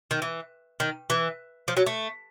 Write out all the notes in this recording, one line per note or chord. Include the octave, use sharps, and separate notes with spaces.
D#3
E3
D#3
E3
F3
F#3
A3